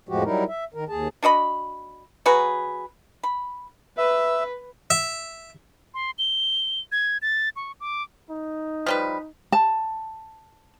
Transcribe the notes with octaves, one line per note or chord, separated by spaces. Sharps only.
F2 A2 F3 G#3 F#4 G4
F#3 G3 D#4 E4 A#4
E5
D#3 A#4
D#2 G#4 A5
D4 F#4 D#5 B5
F#3 F#4 G#4 B4
B5
B4 E5
E5
C6
G7
G#6
A6
C#6
D6
D#4
F3 G3 B4
A5